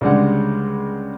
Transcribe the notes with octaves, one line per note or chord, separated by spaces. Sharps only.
C#2 D3 G3 G#3 F#5